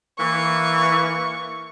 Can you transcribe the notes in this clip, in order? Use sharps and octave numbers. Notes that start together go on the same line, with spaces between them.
E3 A#3 C#6